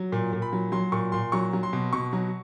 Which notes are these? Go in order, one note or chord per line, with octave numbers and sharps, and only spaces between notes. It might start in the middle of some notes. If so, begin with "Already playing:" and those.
Already playing: F#3
A#2
A#2
B5
F#3
F#3 C6
A#2 C#6
A#2 C6
F#3 C#6
F#3
C6
B2
B2 C#6
F#3